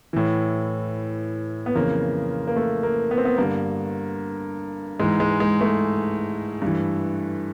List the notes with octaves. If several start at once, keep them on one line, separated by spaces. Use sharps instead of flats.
A2 E3
B3
F2 C#3 E3 A#3
A#3
A3
A#3
B3
C4
B3
G2 D3 A#3
G#2 E3 G#3
G#3
G#3
A3
G2 E3